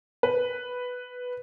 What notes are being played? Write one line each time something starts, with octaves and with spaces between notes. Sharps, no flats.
B4